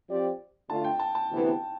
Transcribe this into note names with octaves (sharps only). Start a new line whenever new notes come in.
F3 C4 G4 D5
D3 A3 D4 F4 A5
G5
A5
A5
D2 C3 E3 B3 E4